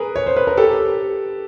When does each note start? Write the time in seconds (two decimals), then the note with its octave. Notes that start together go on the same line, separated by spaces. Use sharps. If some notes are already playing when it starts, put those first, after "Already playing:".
Already playing: G#4 A#4 B4
0.16 C#5
0.26 C5
0.36 B4
0.47 A#4
0.57 G4 A4